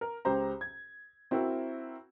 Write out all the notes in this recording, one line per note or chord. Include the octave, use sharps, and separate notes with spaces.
A#4
C#2 G4 C5 A#5
G#6
C4 E4 F#4 A#4